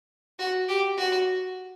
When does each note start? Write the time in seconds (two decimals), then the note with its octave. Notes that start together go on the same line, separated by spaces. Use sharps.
0.39 F#4
0.69 G4
0.97 F#4